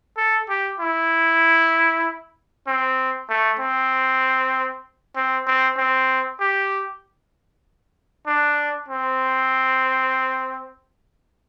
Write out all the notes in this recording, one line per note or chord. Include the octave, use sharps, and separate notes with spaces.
A4
G4
E4
C4
A3
C4
C4
C4
C4
G4
D4
C4